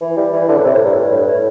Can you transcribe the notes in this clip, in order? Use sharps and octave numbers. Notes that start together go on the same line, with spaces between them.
E3
G3
E3
D3
A2
C3
A2
G2
A2
G2
A2